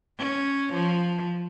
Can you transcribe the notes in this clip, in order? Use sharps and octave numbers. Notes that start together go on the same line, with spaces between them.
C#4
F3